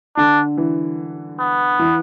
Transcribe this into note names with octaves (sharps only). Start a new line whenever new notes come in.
D3 D4
E3
B3
E3